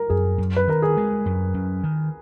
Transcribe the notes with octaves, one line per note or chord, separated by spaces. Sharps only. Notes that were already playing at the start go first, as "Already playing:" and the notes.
Already playing: A#4
F#2 G#4
F#2
B4
D#3 A#4
G#4
G#3
F#2
F#2
D#3